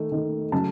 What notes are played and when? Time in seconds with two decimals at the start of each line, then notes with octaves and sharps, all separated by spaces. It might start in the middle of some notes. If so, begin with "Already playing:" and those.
Already playing: D#3 A3
0.12 D#3 A3
0.52 C#3 F#3 A3 A5